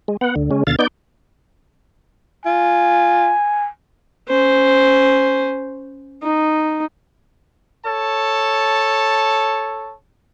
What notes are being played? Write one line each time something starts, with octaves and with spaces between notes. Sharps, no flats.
G#3
B3 F#5
D2 D3
C#3 G#3 C#4
D#2 B2 D3 F5 A6
B3 D#4 D5 G6
F4 G#5
C#4 C5
D#4
A4 C#5 A5